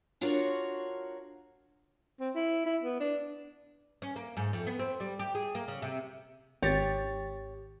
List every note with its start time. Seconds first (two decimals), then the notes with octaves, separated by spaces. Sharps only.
0.21 D4 F4 F#4 A#4 C#5
2.20 C4
2.35 E4
2.66 E4
2.83 B3
3.00 D4
4.02 C#4
4.16 A#3
4.37 G#2
4.53 F2
4.67 B3
4.79 C4
5.00 G3
5.19 G4
5.35 G#4
5.55 A#3
5.68 C#3
5.82 C3
6.62 G#1 G4 C#5 A6